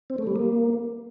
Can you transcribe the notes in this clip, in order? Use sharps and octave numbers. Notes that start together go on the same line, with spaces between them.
C4
A3
G3
A#3